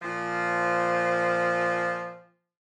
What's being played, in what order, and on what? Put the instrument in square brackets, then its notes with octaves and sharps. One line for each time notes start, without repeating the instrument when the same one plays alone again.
[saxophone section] A#2 F3